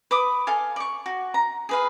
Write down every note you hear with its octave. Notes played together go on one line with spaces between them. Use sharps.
B4 D6 D#6
A4 F5 G#5
D5 C#6
F#4
A#5
G#4 B4 F5